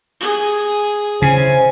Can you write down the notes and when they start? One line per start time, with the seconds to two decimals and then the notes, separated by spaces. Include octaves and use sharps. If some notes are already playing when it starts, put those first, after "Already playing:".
0.21 G#4
1.22 C#3 C#4 E4 C5 G#5